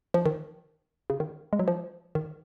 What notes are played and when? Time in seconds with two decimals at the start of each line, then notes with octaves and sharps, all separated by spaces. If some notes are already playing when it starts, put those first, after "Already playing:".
0.14 F3
0.26 D#3
1.10 C#3
1.20 D#3
1.53 G#3
1.59 F#3
1.68 F3
2.15 D#3